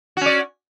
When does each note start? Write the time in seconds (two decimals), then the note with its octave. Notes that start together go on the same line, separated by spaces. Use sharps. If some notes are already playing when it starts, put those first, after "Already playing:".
0.17 F#4
0.21 C#4
0.26 D5